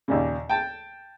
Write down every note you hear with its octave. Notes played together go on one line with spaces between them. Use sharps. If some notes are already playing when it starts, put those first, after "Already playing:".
D#2 A#2 C#3
G5 A5